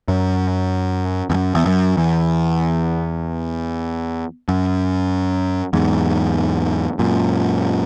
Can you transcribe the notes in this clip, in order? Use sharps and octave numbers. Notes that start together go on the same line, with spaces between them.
F#2
E2
F#2
E2
F#2
E2
F#2
E2 G#2
F#2 A#2